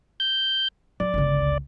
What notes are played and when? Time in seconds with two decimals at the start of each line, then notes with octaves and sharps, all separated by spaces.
0.20 G6
1.00 F#3 D5
1.14 G1 C#2